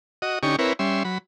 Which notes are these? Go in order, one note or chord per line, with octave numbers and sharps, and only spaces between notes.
F#4 D#5
D3 C#4 D#4 G4 C#6
C4 E4 A#4 B4 C#5
G3 C#4 E5 C6
F#3 B5